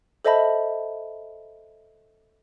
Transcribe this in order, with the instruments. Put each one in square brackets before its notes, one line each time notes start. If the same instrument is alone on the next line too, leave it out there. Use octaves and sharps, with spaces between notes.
[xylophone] A4 C5 D#5 E5 A5 B5